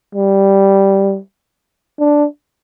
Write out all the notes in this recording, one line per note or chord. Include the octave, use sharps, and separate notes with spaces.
G3
D4